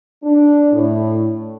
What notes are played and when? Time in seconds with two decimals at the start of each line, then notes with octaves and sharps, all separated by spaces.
0.23 D4
0.72 A2